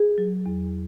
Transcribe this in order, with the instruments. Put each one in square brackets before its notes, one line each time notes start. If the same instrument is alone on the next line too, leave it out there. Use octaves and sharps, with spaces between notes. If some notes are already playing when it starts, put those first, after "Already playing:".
Already playing: [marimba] G#4
F#3
E2